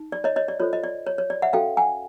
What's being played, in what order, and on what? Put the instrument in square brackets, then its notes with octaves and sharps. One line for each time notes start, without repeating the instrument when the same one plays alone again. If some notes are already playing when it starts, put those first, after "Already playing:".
Already playing: [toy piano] D#4
D5
C#5 D#5
C#5 D#5
D5
F4 A4 C5 C#5
D#5
D5
C#5
C#5
D5
E5 F#5
C#4 F#4 A4 F5 G5
F#5 G#5